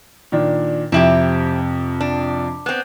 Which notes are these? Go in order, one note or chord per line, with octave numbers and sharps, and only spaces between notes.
A#2 D#3 D4
F2 C3 C4 E4 G4
D4
B3 C4